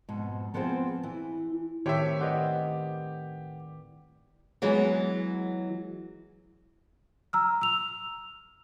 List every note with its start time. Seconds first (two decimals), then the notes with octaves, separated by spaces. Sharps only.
0.09 F2 G#2 B2
0.54 F3 B3 C4 F4 G#4 C5
1.03 E3
1.86 A2 D#3 C4 G4 C#5 E5
2.21 G4 B4 C5 D5 D#5 F#5
4.62 E3 F#3 G#3 B3
7.33 A#5 E6 F6
7.62 E6 F7